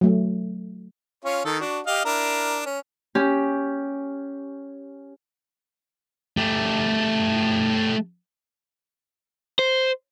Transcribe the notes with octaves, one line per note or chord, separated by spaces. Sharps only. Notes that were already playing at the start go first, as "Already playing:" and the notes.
F#3 A3
C#4 F4 C#5
D#3 A4
D4 F#4
G4 D#5 F5
D4 E4 A#4
C#4
C#4 G4
A3 G4
C5